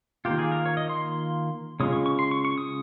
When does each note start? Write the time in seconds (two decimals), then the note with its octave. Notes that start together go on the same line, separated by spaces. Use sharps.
0.25 D#3 A#3 F4 G4
0.39 G#4
0.52 A#4
0.65 C#5
0.77 D#5
0.89 C6
1.80 C#3 G#3 C#4 F4 D#6
1.93 C#6
2.06 C#6
2.19 C6
2.31 C#6
2.45 C#6
2.58 D#6